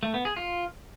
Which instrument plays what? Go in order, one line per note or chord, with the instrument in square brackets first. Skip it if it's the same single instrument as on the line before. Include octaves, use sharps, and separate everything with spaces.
[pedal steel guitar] A3
B3
G#4
F4